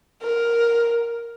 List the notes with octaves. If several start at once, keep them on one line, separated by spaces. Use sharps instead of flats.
A#4